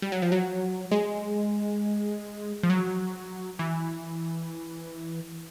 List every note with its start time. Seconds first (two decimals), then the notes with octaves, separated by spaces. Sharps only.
0.02 G3
0.12 F#3
0.22 F3
0.32 F#3
0.91 G#3
2.63 F3
2.70 F#3
3.59 E3